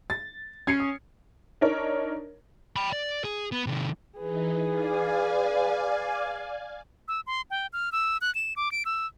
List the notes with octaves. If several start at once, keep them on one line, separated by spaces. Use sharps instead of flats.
A6
C#4 G#6 C7 C#7
D#6
D4 D#4 A#4 C#5
G5 B5
D5
G#4
B3
C3 D#3
E3 D#4 G#4 B4
D5 F5 G#5
E6
C6
G5
F6
E6
F#6
E7
D6
D7
E6